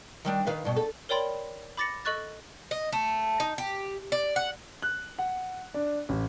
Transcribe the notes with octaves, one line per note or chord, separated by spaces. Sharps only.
D#3 G3 D4
D#3 B4 F5
G2 B2
A4
A#4 C#5 D5 G5 B5 C6
B5 D6 A6 A#6 C#7
A4 D#5 C#6 F#6 A6
D#5
A3
D#4
G4
D5
F#5
F#6
F#5
D4
A1